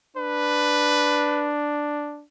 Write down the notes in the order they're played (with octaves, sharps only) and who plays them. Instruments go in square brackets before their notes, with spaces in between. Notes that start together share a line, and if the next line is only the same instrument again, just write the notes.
[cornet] D4 [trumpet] B4